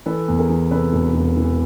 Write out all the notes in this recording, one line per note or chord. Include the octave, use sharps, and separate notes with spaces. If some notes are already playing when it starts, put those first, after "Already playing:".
E3 A4 B4
E2
G#4 A#4
E3
C3 A4 B4
E1
E1
E3